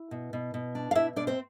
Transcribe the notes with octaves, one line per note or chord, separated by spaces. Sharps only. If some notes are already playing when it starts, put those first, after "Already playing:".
Already playing: E4
B2
B2
B2
D4
F5
B2 E4 E5
B2 D4 D5
C4 C5